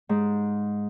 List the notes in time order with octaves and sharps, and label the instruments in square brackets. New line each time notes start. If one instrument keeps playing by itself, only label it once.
[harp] G#2